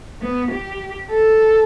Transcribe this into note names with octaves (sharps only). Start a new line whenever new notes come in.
B3
G4
A4